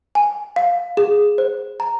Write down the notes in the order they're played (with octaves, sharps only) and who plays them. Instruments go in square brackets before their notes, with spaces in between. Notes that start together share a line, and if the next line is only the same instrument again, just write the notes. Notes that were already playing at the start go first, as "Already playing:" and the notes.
[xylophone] G#5
F5
G#4
C5
A#5